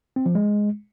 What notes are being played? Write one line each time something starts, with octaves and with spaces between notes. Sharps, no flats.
C4
F3
G#3